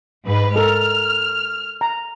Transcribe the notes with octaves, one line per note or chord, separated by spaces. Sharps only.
G#2 B4
A4 A#4 F6
A#5